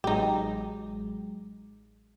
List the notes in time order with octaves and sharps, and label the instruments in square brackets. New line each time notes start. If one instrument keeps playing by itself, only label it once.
[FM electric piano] A1 F#3 G#3 [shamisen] D#4 G4